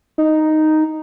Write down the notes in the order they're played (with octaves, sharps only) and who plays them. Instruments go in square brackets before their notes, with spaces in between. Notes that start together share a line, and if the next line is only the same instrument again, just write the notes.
[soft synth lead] D#4